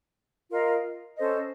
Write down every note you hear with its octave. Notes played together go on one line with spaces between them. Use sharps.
F4 A#4 D#5
C#4 A4 C5 D#5